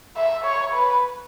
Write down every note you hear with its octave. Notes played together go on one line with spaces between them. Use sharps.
E5
C#5
B4